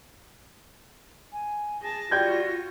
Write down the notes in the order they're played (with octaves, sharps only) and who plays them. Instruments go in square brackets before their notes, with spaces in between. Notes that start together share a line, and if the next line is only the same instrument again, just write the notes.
[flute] G#5
[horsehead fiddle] G#4 A5 [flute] A#6
[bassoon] G3 [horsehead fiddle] F4 F#4 [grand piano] G5 G6 G#6